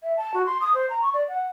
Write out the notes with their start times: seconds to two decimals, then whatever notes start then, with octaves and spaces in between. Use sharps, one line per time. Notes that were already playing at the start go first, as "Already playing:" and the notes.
0.03 E5
0.17 A5
0.34 F#4
0.46 C6
0.61 D#6
0.74 C5
0.90 A#5
1.02 C#6
1.14 D5
1.28 F#5